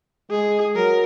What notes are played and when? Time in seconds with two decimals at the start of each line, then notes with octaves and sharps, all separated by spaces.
0.30 G#3 G#4
0.76 F#3 A#4